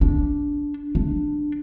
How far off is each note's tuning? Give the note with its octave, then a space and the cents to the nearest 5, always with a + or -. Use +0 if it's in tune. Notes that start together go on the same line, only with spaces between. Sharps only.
D4 -15
D4 +10